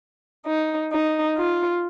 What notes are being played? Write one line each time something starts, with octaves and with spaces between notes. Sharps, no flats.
D#4
D#4
F4